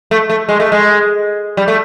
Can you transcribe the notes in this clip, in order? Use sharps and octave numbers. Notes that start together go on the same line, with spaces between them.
A3
A3
G#3
A3
G#3
G3
A3